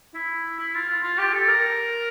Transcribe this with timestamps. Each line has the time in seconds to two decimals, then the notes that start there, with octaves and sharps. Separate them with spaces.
0.15 E4
0.59 E4
0.75 F4
0.89 F4
1.03 F4
1.18 G4
1.33 A4
1.48 A#4